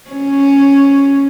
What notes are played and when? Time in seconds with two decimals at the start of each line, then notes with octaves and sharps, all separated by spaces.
0.11 C#4